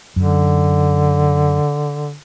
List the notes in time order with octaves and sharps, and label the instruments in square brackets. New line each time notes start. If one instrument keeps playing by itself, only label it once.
[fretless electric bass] F#2 [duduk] D3